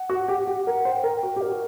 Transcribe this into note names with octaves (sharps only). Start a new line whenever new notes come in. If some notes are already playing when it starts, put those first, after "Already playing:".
Already playing: F#5
F#4
G4
G4
A#4 F#5
C5
G5
A#4
G5
F#4
G4
F#4 A#4
F#4